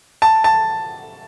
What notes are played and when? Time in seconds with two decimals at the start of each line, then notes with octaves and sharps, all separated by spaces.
0.22 A5
0.44 A5